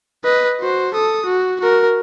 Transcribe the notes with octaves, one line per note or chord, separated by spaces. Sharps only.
B4 D#5
F#4 C5
A4 D#6
F#4
F#4 A#4